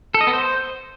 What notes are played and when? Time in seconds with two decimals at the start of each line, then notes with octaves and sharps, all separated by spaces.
0.14 A4
0.21 D#5
0.27 B3
0.33 C5